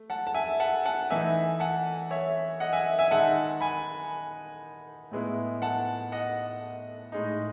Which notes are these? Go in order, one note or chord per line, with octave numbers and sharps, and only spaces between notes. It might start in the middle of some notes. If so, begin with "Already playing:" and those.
Already playing: A3
F#5 A5
A5
E5 G#5
F#5 A5
F#5 A5
E3 A3 D#4 E5 G#5
F#5 A5
C#5 E5
D#5 F#5
E5 G#5
E5 G#5
D#3 G#3 D#4 F#5 A5
G#5 B5
A2 G#3 B3 E4
F#5 A5
D#5 F#5
A2 G#3 D#4